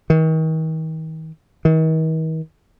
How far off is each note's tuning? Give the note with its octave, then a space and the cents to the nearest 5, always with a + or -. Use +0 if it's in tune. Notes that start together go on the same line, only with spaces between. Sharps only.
D#3 +40
D#3 +45